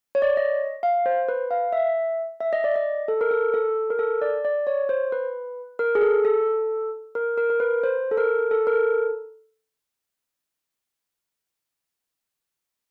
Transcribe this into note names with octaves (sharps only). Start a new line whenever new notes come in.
C#5
D5
C#5
D#5
F5
C5
B4
F5
E5
E5
D#5
D5
D#5
A4
A#4
A4
A4
A#4
A4
D5
D5
C#5
C5
B4
A#4
G#4
A4
A4
A#4
A#4
A#4
B4
C5
A4
A#4
A4
A#4
A4